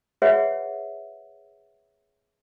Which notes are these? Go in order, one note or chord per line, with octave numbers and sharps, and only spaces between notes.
F#4 G#4 B4 C#5 E5 F#5